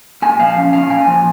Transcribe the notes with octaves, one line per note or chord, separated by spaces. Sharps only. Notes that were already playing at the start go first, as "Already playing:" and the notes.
A#2 G#5
F3 F5
C#4
A#2 F5
A#2 G#5
F3